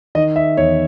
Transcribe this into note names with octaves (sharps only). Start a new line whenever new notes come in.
D#3 D#5
E5
E2 C#5